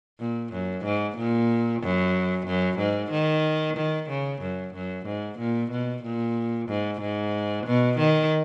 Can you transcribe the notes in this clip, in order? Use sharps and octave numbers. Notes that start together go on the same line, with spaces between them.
A#2
F#2
G#2
A#2
F#2
F#2
G#2
D#3
D#3
C#3
F#2
F#2
G#2
A#2
B2
A#2
G#2
G#2
B2
D#3